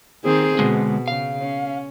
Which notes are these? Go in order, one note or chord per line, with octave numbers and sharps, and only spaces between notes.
D#3 C4 G#4
B2 D3 G#3
C#3 F5
C#4